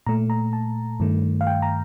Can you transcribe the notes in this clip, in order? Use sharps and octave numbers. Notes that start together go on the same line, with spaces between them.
A#2 A3 A#5
A#5
A5
G2 D#3 A3
F5
G5
A#5